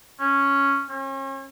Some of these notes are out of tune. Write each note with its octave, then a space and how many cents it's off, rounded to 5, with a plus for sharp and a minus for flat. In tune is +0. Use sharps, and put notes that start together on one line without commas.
C#4 +0
C#4 -40